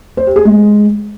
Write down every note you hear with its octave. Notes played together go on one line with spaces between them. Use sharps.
C5
G4
G#4
G#3